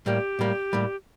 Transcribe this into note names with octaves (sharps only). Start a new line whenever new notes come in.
A2 G3 A#3 G4
A2 G3 A#3
A2 G3 A#3